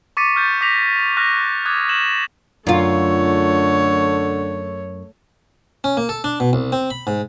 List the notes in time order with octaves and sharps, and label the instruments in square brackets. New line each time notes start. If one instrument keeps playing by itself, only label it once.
[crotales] C#6 D6 A6 B6 C#7 D#7
C#6 F6 G6 A6
D6 A#6 B6 F7
C#6 F6 F#6 A#6
D6 D#6 F#6 G#6
G6 E7 F#7
[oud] F#2 F4 [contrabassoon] D3 [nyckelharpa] A3 C#5
[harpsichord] C#4
A#3
A4
D4
B2
C2
C4
B5
G#2